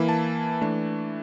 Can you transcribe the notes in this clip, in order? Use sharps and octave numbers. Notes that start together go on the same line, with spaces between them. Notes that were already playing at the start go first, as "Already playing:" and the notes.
Already playing: E3 A#3 E4
A5
E3 A3 D4